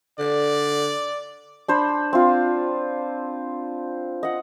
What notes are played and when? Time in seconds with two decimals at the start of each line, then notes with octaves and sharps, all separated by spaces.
0.19 D3 D5
1.68 D4 C5 B5
2.13 C4 F4
4.23 D#5 F#5